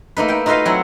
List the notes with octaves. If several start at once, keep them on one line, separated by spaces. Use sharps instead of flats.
A3 A#3 D#4 B4
E4 G5
D#4 F4 F#4 B4 D#5 F5
F#3 C4 E4 F#5